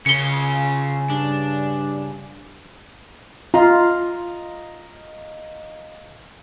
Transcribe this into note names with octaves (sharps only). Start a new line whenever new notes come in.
C#3 C#4 F4 C#7 G7
G2 D4
F4 D#5 F5 A#5